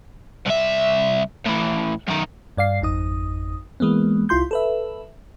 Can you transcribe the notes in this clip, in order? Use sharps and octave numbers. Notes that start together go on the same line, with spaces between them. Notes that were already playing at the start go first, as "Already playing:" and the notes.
C2 E5
A2 E3
F#2 D#3
G2 D5 F5 C7
G#1 F2 D#4 D#6
E3 G#3 A#3 B3
C2 E4 F4 C6 G6
A4 B4 E5